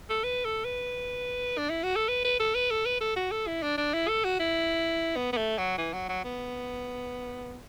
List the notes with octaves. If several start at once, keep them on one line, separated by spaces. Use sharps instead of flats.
A4
B4
A4
B4
D4
E4
F#4
A4
B4
B4
A4
B4
A4
B4
A4
F#4
A4
E4
D4
D4
E4
A4
F#4
E4
B3
B3
A3
F#3
E3
F#3
F#3
B3